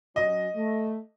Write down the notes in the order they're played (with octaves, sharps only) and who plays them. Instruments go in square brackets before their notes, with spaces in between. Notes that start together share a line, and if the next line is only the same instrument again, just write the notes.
[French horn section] F#3 C#4 [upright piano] D#5
[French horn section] A3